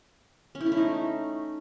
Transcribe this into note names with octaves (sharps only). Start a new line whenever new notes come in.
C#4
E4
A3
E4
D#4